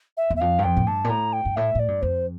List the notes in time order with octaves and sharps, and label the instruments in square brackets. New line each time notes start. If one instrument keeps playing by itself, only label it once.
[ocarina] E5
[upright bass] E2
[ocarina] E5
[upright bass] F2 [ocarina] F5
[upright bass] G2
[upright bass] F2 [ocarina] G5
[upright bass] A2
[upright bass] G2 [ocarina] A5
[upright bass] A#2
[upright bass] A2 [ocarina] A#5
[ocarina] G5
[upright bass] G2
[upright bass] A2 [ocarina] E5
[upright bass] A2 [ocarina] D5
[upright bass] G2
[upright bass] F2 [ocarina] C5